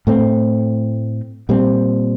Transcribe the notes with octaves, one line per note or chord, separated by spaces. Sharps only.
A2 A3 C4
A#2 G3 C4